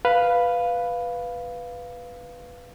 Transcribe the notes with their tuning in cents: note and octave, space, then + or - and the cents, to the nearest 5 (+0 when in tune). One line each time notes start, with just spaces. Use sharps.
B4 +0 F5 +0